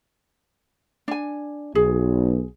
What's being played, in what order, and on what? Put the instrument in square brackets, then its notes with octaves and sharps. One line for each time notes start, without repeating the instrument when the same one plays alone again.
[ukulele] D4 G#5
[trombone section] B1 [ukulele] G#4